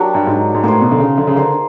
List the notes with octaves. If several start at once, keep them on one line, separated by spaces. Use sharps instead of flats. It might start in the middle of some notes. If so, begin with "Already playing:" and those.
Already playing: F#3 A#3 D4 G4
G2
G#2
G#2
A2 A#3 D#4 G#4 C5
B2
D3
C#3
D3
C#3
D3 A#3 D#4 G#4 C5